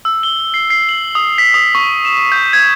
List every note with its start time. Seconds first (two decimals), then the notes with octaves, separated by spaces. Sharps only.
0.05 E6
0.23 G7
0.54 C7
0.70 C7
0.89 F#7
1.15 D#6
1.38 B6
1.54 D#6
1.75 C#6
2.05 E7
2.32 G6
2.53 G#6